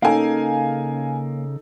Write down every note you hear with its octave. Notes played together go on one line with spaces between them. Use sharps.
C#3 A#3 D#4 A4 F5 G#5